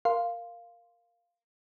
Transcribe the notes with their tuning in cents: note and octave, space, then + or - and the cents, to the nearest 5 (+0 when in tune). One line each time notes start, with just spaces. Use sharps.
A#4 +0 F5 +0 C6 +0